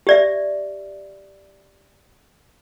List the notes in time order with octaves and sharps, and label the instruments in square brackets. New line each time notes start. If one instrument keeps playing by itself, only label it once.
[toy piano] G4 D5 E5